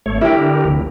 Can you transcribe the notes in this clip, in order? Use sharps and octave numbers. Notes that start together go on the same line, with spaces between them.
G#1 A3 C#5
D3 E4 G4 A#4 G5
F1 D2